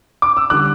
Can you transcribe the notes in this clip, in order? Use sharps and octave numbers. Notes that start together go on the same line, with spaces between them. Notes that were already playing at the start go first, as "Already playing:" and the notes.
D6
E6
D3 G3 D6 F#6